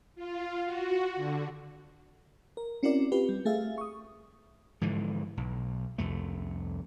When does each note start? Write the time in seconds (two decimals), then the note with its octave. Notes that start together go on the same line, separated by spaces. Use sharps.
0.15 F4
0.65 F#4
1.15 D3
2.57 A#4
2.83 C4 C#4 E4 F#4 A#4 D5
3.12 C4 F4 G4 B4
3.29 G3
3.45 A3 G#4 E5 F5
3.78 C#6 D#6
4.81 G#2 D3 E3 F3
5.37 B1
5.98 C2 F2 A3